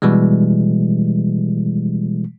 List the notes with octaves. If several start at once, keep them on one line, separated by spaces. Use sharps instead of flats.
B2 E3 G3 G#3